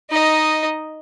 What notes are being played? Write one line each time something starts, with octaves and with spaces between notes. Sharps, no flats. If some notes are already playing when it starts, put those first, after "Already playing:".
D#4 D#5